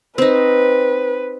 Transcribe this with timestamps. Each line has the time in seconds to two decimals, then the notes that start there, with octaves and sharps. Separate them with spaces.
0.18 C4 D#4 B4